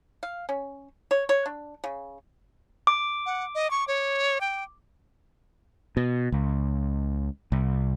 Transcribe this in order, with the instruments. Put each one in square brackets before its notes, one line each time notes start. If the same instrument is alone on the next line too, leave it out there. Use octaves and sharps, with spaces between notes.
[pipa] F5
C#4
C#5
C#5
D4
C#3
[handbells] D6
[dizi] F#5
D#5
C#6
C#5
G5
[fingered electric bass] B2
C#2
C2